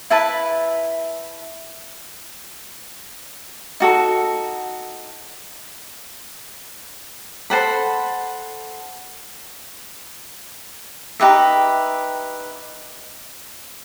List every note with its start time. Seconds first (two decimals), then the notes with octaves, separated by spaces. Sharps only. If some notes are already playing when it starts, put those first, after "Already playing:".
0.10 E4 B4 E5 A5
3.80 D#4 F#4 A4
7.50 A4 C5 F#5 B5
11.20 D#4 G4 B4 E5